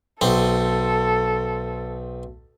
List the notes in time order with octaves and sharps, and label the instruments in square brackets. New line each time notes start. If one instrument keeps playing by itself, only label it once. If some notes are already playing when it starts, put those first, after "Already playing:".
[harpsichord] B1 C4 [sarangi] A4